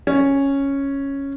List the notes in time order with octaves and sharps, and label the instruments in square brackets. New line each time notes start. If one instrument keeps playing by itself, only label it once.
[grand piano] C#4